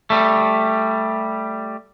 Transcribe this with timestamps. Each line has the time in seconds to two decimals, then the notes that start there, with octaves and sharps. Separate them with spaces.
0.10 G3 A3